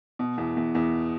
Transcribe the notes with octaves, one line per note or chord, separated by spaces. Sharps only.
B2
E2
E2
E2